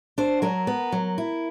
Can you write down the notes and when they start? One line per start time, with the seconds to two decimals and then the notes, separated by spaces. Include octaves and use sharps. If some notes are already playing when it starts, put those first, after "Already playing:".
0.18 D4 C5
0.42 F#3 A#4
0.67 B3
0.92 F#3
1.18 E4